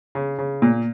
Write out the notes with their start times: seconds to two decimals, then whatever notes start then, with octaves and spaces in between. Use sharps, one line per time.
0.15 C#3
0.38 C#3
0.62 A#2